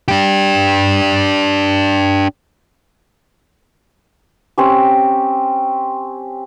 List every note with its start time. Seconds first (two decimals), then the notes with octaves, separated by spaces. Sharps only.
0.08 D4 G4
4.58 C4 C#4 G4